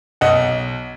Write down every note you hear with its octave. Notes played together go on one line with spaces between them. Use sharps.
B1 D#5 F#5